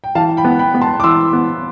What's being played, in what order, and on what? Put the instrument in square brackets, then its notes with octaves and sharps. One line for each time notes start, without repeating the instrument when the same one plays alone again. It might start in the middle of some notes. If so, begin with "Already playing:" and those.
[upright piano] G5
[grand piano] E3 [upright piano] F5 A5
[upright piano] G5 B5
[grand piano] B3
[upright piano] G5 B5
[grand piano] B3
[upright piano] A5 C6
D6
[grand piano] E3 [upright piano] C6 E6
[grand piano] B3